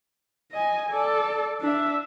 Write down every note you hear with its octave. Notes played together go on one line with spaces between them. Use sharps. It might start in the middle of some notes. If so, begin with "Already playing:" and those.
D#5 G#5
A4 D5
D4 E5